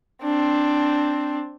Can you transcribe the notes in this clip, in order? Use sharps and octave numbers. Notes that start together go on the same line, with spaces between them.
C4 D4